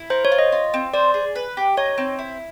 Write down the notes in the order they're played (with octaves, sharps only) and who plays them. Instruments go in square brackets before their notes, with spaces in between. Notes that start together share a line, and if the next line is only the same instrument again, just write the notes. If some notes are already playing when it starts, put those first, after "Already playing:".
Already playing: [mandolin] E4
[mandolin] A#4 [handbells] C5
[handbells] C#5
[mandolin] F4
[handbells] D#5
[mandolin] F4
C4
[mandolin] C5 [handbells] D5
[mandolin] G#4
B4
G4
[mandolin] D#4 [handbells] C#5
[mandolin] C4
E4